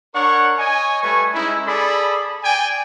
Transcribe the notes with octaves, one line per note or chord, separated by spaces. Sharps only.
D4 A#4 C#5 F#5 C#6
C#5 D#5 G#5
G3 A3 B4 G#5 C#6
G#3 C#4 D#4 E4
G#4 A4 D5 B5
D5 G5 G#5